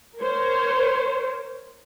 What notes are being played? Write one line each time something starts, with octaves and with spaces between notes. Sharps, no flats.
A#4 C5 C#5